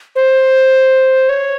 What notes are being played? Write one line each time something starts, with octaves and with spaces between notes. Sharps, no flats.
C5
C#5